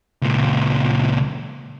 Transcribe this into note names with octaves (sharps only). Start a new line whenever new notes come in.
C#2 A#2